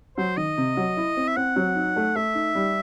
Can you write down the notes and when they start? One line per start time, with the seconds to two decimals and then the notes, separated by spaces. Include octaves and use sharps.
0.17 F#3 C5
0.37 D#3 D#5
0.57 C3
0.77 F#3
0.97 E4
1.17 C4
1.28 E5
1.37 C4 F#5
1.56 F#3
1.76 D#4
1.96 A3
2.16 A3 E5
2.35 D#4
2.55 G3